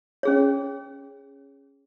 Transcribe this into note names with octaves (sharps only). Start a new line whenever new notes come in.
C#4 G#4 C#5